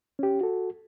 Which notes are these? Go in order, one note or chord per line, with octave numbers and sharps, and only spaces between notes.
C#4 G4
F#4 A4